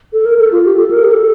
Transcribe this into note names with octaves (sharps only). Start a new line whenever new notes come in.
A4
A#4
A4
F4
G4
A4
A#4
G4
A4